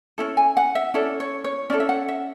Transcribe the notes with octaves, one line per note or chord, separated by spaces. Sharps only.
C#4 E4 A4
G#5
F#5
E5
C#4 E4 A4 D5
C#5
C#5
C#4 E4 A4 D5
E5
F#5
E5